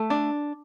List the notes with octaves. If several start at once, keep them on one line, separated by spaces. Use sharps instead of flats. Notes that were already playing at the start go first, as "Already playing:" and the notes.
Already playing: A3
D4